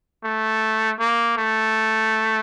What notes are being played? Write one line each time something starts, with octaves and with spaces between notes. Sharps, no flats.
A3
A#3
A3